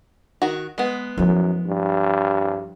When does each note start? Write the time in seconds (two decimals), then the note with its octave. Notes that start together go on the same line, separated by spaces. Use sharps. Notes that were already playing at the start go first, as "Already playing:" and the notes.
0.42 D#3 F#4
0.78 G#3 B3
1.18 F#2 F3 E4
1.67 G2